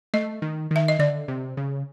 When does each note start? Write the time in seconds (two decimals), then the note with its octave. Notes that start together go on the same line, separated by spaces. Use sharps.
0.14 A3 D#5
0.42 D#3
0.71 D#3 E5
0.88 D#5
0.99 D3 D5
1.28 C3
1.57 C#3